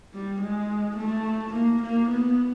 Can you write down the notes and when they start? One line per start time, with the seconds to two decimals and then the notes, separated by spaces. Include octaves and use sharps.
0.13 G3
0.42 G#3
0.97 A3
1.54 A#3
1.83 A#3
2.10 B3